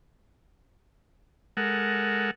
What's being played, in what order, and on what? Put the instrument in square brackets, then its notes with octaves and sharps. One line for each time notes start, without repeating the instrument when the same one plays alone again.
[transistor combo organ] G#3 A4 A#4 F#5